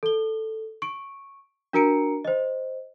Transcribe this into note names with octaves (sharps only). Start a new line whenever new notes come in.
A4 G7
C#6 D7
D4 F#4 A#4 A#5 C#7 D7
C5 D#5